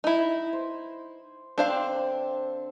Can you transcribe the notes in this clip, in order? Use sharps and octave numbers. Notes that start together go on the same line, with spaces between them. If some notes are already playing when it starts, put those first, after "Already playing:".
D#4 E4
C5
D3 C4 D4 C5 F5 D6